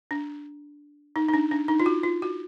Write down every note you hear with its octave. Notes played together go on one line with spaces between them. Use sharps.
D4
D#4
D#4
D4
D4
D#4
F4
F#4
F4
F#4